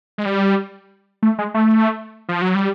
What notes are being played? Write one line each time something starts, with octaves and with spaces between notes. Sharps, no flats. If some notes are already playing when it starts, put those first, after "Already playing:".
G#3
G3
A3
G#3
A3
F3
F#3
G3